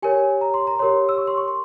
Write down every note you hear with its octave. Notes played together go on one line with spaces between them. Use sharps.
G4 A#4 C#5 G#5
A#5
C6
A#5
G4 A#4 C#5 C6
E6
C#6
C6
C#6
C6